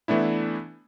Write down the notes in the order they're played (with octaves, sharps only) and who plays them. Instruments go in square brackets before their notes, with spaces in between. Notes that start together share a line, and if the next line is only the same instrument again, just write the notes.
[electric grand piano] E3 A3 B3 D4 E4